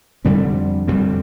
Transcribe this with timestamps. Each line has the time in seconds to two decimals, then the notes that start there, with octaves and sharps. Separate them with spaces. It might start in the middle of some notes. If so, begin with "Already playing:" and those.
0.25 F2 D3 G3 C4
0.88 F2 D3 G3 C4